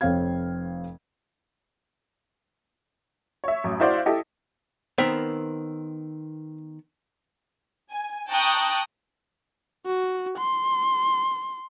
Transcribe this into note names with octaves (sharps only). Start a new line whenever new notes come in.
F1 F2 C4 C#5 F5 G#6
C#5 E5
A1 F#2
E4 F#4 C5 D5 F5
E4 G4 A4 D#5
D#3 B3 C4 A#4 B5
G#5
G5 A5 A#5 C#6 D#6 F#6
F#4
C6